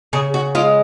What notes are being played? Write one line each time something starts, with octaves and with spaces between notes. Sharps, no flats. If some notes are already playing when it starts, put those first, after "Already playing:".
C#3 G#4
F#4
G#3 F4